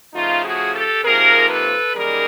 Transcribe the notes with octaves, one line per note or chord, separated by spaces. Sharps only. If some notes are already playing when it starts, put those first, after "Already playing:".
C#3 F3 A3 D#4 F4
F#4 G#4
G4 A4
C3 F3 A#3 D#4 G#4 A#4
A4 B4
F#2 D#3 G3 A#3 D#4 G#4 A#4